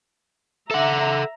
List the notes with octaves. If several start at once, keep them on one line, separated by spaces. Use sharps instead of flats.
A4 E5 F#5 A#5